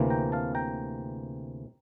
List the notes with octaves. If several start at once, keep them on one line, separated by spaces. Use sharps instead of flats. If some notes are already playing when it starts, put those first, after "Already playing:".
Already playing: D2 C3 E3 A#3
G5 A#5
F5 A5
G5 A#5